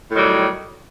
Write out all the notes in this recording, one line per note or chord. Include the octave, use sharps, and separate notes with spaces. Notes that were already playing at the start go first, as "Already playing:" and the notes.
A2 D#3 F#3 G3